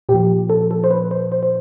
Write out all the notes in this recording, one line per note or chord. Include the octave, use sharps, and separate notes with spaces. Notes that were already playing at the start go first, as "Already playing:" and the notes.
A#2 F3 G4
A4
A4
C5
B4
C5
C5
C5